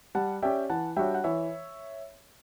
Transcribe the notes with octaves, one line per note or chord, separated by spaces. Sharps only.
G3 F#5 A5
C#4 G4 D5 E5 G5
E3 F#5 A5
G3 D4 F#4 C#5 E5 G5
F#5
E3 C#5 E5